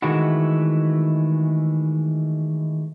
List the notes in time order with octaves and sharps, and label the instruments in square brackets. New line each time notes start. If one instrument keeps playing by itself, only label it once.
[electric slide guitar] D#3 E3 G#3 A3 E4 F#4